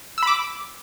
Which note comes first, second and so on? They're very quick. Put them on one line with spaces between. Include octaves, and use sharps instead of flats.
E6 B5 D6